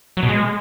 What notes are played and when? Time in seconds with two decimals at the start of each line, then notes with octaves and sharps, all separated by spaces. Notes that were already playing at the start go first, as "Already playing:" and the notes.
0.17 F#3
0.23 B2
0.29 G#3